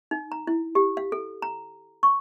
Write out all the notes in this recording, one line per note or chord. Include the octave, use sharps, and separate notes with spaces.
D#4
A#5
E4
G4
F5
A4
A#5
C#6